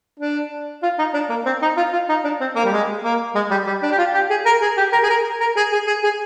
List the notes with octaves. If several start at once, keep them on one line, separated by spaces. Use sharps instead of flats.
D4
F4
D#4
D4
A#3
C4
D#4
F4
F4
D#4
D4
C4
A#3
G3
G#3
A#3
G#3
G3
G3
D4
G4
F4
G4
G#4
A#4
G#4
G4
A#4
G#4
A#4
A#4
G#4
G#4
G#4
G#4